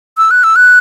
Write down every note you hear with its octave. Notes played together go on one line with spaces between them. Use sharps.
E6
F#6
E6
F#6